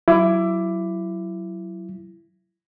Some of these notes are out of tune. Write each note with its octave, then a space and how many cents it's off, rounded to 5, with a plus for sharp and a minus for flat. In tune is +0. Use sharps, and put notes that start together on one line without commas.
F#3 +15 E4 +20 D6 +0